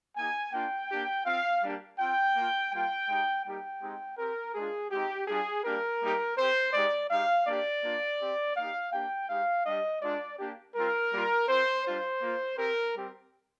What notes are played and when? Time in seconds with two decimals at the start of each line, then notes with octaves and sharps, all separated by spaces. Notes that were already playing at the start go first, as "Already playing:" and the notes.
0.16 A#3 D#4 G4 G#5
0.52 A#3 D4 F4 G5
0.90 A#3 D4 G4
1.26 C4 F4 F5
1.63 G3 A#3 D4 G4
1.99 C4 F4 G5
2.35 A#3 F4
2.72 G3 A#3 F4 G5
3.08 G#3 D#4 G4
3.45 G3 A#3 D#4 G4 G5
3.82 G#3 C4 D#4 G4
4.18 C4 G4 A#4
4.55 G#3 D4 F4 G#4
4.91 G#3 C4 D#4 G4
5.28 G3 D4 F4 G#4
5.64 G3 A#3 D4 G4 A#4
6.01 G3 A#3 D#4 G4
6.37 C4 G4 C5
6.73 G#3 D#4 G4 D5
7.10 G#3 D#4 G4 F5
7.47 A#3 D4 G4 D5
7.84 A#3 D4 F4
8.20 C4 G4
8.57 A#3 D#4 G4 F5
8.93 A#3 D4 G4 G5
9.29 G#3 D#4 G4 F5
9.66 G3 D4 G4 D#5
10.02 G#3 D4 F4 D5
10.39 A#3 D4 G4
10.76 G3 C4 F4 A#4
11.12 G3 A#3 F4
11.48 C4 F4 C5
11.85 G3 D4 F4 C5
12.22 A#3 F4
12.58 C4 G4 A#4
12.94 G3 C4 G4